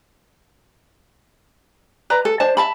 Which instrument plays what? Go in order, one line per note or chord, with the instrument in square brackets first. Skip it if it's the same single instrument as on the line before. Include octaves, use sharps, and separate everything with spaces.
[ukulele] B4 D5 A#5
A4
D4 C5 A5
E5 A5 B5